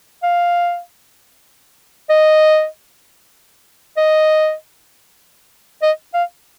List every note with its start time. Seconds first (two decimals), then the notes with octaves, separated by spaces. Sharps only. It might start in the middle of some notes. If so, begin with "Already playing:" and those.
0.23 F5
2.09 D#5
3.97 D#5
5.82 D#5
6.14 F5